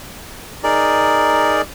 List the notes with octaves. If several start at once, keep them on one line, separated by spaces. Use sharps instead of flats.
D#4 G#4 A#4 D5